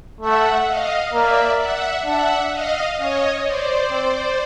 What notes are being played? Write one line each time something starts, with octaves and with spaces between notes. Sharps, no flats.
A3 E5 F#5
D#5 F5
A#3 D5 E5
E5 F#5
D4 E5 F#5
D#5 F5
C#4 C#5 D#5
C5 D5
C4